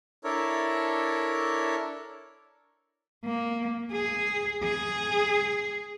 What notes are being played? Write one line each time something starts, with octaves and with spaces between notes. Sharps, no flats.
D4 E4 A4 A#4 C#5
A#3
G#4
G#4